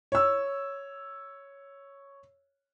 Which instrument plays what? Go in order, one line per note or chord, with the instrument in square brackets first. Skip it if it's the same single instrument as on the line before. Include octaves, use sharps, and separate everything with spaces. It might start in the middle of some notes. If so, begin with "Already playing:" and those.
[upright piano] C#5 E6